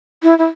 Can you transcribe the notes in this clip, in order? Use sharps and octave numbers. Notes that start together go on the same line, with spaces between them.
E4
E4